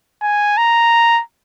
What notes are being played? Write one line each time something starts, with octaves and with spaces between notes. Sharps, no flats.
G#5
A#5